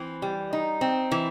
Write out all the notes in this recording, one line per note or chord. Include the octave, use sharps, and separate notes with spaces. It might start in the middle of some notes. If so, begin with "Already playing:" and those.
Already playing: E3 C4
G3
D#4
C4
E3